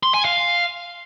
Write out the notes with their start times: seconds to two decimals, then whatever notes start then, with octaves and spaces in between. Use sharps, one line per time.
0.03 C6
0.14 G#5
0.25 F5